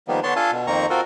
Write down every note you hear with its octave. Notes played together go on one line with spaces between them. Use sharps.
D#3 F3 G3 A#3 B3
D3 B3 D4 C#5 A5 C6
D4 F4 A4 F5 G#5 A5
B2
F2 D#3 A#3 C4 A#5 C#6
C4 F4 F#4 A4 A#4